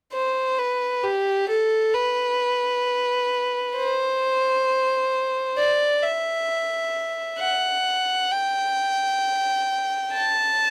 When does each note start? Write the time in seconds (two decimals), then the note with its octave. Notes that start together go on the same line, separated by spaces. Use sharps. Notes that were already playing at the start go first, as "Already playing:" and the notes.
0.13 C5
0.58 B4
1.03 G4
1.49 A4
1.94 B4
3.76 C5
5.58 D5
6.03 E5
7.40 F#5
8.31 G5
10.13 A5